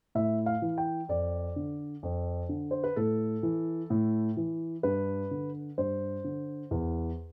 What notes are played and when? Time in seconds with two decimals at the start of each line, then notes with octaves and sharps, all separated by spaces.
0.15 A2 E5
0.46 F5
0.62 E3
0.78 G5
1.09 F2 D5
1.56 D3
2.03 F2
2.49 D3
2.71 C5
2.84 B4
2.96 A2 A4
3.43 E3
3.90 A2
4.37 E3
4.83 G2 B4
5.31 D3
5.78 G2 C5
6.24 D3
6.71 E2